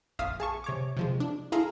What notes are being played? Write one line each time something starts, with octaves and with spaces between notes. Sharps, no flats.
A#1 F2 E5 F5 D#6 F6
G#4 A5 C#6
C3 C#5 D6
C3 F3 G#3
D4
E4 G#4 A4 F5 A#5 C6